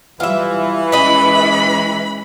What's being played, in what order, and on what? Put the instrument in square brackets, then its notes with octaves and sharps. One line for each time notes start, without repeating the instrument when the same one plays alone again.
[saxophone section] E3 [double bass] G3 [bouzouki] F4 E5
[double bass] G#3 C#4 [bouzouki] B4 D#5 [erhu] B5